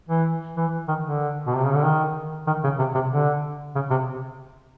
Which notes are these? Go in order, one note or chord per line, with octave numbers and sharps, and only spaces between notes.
E3
E3
D#3
D3
B2
C3
C#3
D3
D#3
D#3
C#3
C3
C3
D3
C#3
C3